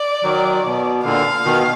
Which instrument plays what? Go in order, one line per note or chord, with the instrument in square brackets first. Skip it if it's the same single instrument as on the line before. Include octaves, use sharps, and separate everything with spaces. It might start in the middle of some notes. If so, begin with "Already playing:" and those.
Already playing: [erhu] D5
[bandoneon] D#3 F#3
B2
[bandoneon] A#2 D3 [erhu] F5
[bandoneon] B2 D#3